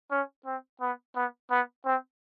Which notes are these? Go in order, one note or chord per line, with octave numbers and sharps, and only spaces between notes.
C#4
C4
B3
B3
B3
C4